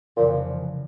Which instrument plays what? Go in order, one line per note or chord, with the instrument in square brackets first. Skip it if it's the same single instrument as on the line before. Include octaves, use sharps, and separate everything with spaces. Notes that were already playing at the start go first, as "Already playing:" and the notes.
[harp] F1 F2 C#3 E3 G3 [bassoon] A#2